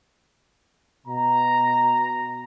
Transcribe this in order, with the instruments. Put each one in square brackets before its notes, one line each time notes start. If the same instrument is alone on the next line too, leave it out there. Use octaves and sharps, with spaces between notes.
[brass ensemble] B2 A#5